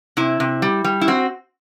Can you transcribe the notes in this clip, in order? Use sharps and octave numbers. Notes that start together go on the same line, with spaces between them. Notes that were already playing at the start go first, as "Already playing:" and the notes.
C3 E4
C3
G3
G3
E4
C4 F#4